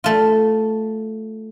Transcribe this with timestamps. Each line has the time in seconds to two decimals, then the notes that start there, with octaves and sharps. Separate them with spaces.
0.04 A3 F4